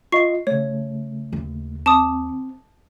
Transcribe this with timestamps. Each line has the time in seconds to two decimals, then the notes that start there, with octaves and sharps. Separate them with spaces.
0.12 F4 D#5 C#6 C7
0.47 C#3 A3 C#5
1.33 D#2
1.86 C4 A5 D6 D#6